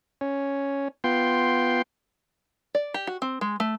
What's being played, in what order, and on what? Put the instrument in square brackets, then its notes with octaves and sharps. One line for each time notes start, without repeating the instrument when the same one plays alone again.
[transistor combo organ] C#4
B3 F4 G5 C6
[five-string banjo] D5
G4
F#4
C4
G#3
A3